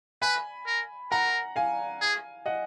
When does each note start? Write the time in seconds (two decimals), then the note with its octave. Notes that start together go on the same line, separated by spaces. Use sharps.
0.22 B4 G#5 B5
0.66 A#4
1.11 A#4 F#5 A#5
1.56 F5 G#5
2.01 G#4
2.46 D#5 F#5